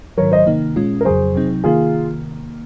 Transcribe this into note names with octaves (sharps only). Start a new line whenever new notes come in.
G#2 D#3 F#3 A#4 C#5
C5 D#5
C3 D#3 A#3 D#4
A#2 G#3 C#4 F4
A#4
F2 C#3 F#3 G#4 C5
C3 F#3 C4 D#4
C3 D#3 A#3 F4 G#4